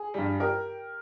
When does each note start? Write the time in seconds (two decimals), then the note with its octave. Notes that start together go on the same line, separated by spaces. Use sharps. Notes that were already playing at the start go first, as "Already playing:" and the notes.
Already playing: G#4
0.14 G2 G3
0.40 G4 A#4